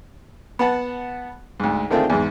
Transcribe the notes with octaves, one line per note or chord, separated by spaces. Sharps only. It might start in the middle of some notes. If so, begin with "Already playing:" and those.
B3 F#5 A5 B5
D2 G#2
D3 D#3 A3 C4 F4 G#4
E2 G#2